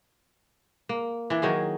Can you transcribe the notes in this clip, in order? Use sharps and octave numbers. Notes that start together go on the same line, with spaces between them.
A#3
E3 D4
D#3 F#3 C#4 G#4